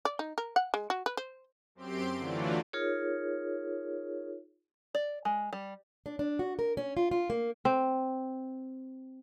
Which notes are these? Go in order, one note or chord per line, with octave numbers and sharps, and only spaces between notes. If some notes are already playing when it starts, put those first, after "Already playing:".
D5
D#4
A#4
F#5
G#3
F#4
B4
C5
F#2 C4 G4 C6 D7
D3 E3 F#3 A3 F4 D5
D#4 F4 G#4 A#4 C#5
D5
G#3
G3
D4
D4
F#4
A#4
C#4
F4
F4
A#3
C4